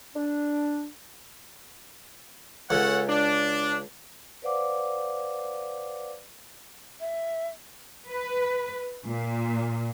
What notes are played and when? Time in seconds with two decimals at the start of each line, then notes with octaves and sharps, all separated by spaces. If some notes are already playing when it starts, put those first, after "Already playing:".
0.15 D4
2.70 C#2 C#4 A4 F#5
3.09 D4
4.42 B4 C5 D5 F5 F#5 D6
7.00 E5
8.09 B4
9.08 A#2